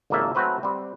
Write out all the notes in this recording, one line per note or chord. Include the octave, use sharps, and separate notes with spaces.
G#1 F2 C#3 A#3 A4 E5
F#3 A3 C4 F#4 B4 C5
G3 C4